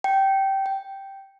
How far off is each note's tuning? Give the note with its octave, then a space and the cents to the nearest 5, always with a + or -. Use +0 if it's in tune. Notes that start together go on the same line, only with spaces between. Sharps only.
G5 -15
G5 -5